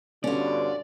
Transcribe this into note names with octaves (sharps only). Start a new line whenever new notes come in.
G2 B2 D3 C#4 F4 D5